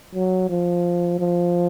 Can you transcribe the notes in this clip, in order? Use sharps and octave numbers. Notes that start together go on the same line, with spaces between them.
F#3
F3
F3